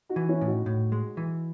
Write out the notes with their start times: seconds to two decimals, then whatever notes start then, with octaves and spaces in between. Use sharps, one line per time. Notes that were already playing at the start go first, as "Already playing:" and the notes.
0.09 D#4 F#4
0.16 E3
0.29 C#4 E4
0.41 A2
0.47 D#4 F#4
0.66 A2
0.92 G#3
1.17 E3